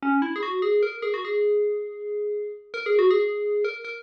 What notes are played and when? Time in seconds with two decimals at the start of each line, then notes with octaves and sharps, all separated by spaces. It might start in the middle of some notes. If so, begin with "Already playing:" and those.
0.03 C#4
0.22 E4
0.36 G#4
0.43 F#4
0.62 G#4
0.83 A#4
1.02 G#4
1.14 F#4
1.25 G#4
2.74 A#4
2.86 G#4
2.99 F#4
3.11 G#4
3.65 A#4
3.85 A#4